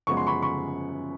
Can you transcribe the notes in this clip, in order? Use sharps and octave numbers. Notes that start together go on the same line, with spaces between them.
F#2 C#3 F3 G#3 B3 C#6
C6
B5 C#6
B5 C#6